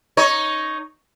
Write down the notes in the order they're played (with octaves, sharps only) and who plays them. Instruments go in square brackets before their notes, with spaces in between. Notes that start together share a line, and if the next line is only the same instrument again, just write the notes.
[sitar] D#4 C#5